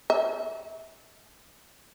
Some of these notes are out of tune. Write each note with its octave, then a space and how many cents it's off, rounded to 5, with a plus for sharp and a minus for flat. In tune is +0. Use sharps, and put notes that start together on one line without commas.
E5 -20